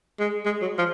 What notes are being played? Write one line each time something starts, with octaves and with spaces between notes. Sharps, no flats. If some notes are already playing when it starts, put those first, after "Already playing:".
G#3
G#3
F#3
F3